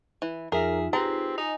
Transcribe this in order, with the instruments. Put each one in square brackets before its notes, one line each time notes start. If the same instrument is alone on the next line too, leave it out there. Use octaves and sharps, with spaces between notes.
[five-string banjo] E3
[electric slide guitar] F2 E5 A#5 [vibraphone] D#4 F4 [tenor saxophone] G#4 [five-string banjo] A#4
[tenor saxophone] C4 [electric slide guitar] G4 G#4 B4 [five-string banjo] A#5
[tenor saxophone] D#4 [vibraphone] D#5 G#5